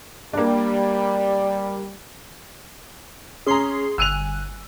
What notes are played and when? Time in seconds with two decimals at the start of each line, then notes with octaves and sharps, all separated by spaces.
0.33 G3 A#3 D4
3.46 C#4 G#4 A#5 C6 C7
3.98 G1 G#5 E6 F#6 D#7 F7